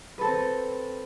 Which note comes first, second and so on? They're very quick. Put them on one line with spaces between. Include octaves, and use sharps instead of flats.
B4 A4 C4